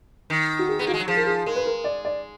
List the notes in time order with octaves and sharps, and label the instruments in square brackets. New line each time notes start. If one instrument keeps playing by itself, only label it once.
[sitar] D#3
[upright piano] F#4
G#4
[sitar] B3 [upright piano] G#4
[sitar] A#3 [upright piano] F#4
[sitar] G#3
F#3
[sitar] F3 [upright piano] G#4
[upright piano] A#4
G#4
[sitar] G#3 [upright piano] A#4
[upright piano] B4
A#4
D5
D5